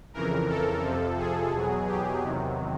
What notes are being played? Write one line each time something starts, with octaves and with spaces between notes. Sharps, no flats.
F2 C#3 E3 A#4
A4
F2 C3 F3
G#4
E2 B2 F#3
G4
E2 C3 D#3 F#3